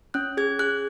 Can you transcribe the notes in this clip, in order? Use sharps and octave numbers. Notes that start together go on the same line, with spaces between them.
C#4 F#6
G#4 G#6
G#4 F#6